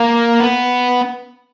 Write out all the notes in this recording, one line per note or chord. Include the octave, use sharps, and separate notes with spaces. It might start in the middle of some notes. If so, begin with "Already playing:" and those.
Already playing: A#3
B3